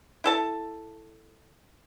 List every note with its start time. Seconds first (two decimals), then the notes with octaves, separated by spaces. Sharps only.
0.24 E4 A4 A5